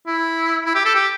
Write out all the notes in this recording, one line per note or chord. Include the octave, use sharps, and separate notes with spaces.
E4
E4
G4
A4
G4